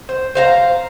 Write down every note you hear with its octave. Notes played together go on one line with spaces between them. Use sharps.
C5
C5 F5 A#5